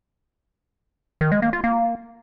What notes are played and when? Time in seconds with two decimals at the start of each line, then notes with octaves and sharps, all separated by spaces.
1.21 D#3
1.32 G#3
1.42 A#3
1.53 F4
1.64 A#3